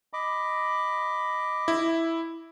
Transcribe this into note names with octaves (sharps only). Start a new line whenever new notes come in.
D#5 B5 D6
E4